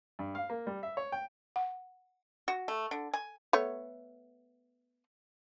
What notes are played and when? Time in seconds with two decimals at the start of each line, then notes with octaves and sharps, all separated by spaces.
0.19 G2
0.35 F5
0.50 A#3
0.67 G3
0.83 E5
0.97 C#5
1.12 G5
1.56 F#5
2.48 F#4
2.68 A3
2.91 D3
3.14 G#5
3.53 A3 B3 C#5